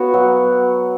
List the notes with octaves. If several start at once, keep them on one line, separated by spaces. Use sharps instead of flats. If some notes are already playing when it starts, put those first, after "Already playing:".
Already playing: B3 F#4 C#5
F#3